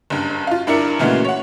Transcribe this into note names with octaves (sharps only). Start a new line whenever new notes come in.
F#1 G2
F4 F5
G2 D4 E4 A#4 C#7
A#2 C#3 E3 G#3 A3 F#4
C#5 F#5